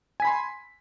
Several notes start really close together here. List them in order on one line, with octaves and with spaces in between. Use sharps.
G#5 B6 B5 C6